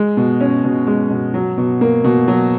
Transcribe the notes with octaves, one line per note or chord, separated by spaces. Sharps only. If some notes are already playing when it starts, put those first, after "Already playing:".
Already playing: G#3
B2
C#4
B2
G#3
B2
F#3
B2
A#3
B2
F#3